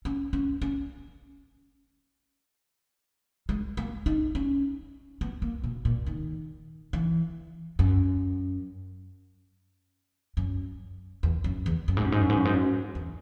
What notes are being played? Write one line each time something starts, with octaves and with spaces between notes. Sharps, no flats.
C#4
C#4
C#4
G#3
A#3
D#4
C#4
B3
A#3
B2
A#2
D#3
E3
F#2
F#2
E2
F#2
E2
F#2
G#2
F#2
G#2
F#2
G#2
F#2
G#2
F#2
E2